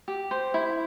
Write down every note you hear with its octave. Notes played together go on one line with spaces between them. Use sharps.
G4
C5
E4